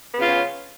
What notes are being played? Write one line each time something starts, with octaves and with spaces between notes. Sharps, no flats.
C#3 B3 C#4 F4